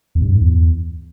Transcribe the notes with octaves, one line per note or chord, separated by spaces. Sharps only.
E2
G2
F#2
G#2
E2